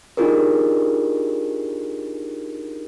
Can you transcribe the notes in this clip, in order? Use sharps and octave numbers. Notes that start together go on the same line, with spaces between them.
D4 D#4 F4 G4 G#4 A#4